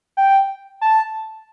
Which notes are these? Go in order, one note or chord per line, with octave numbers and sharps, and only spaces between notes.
G5
A5